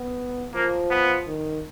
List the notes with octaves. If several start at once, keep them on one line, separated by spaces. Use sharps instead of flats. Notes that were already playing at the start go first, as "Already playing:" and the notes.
Already playing: B3
F3 A#3
B3
D#3